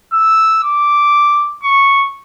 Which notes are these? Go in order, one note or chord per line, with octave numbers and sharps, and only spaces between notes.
E6
D6
C#6